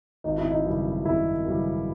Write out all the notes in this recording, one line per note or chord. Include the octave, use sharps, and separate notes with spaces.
G#1 D#4
E4
D#4
F#2 C#3 E3 G3
G#1 E4
F#2 C#3 E3 G3